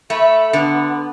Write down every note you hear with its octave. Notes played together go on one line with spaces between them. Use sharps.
A3 E5 B5
D3 B3